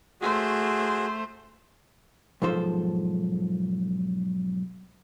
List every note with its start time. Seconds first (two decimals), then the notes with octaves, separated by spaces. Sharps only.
0.21 A3 F#4 G#4 C5
2.42 B1 G#2 F3 A4 C5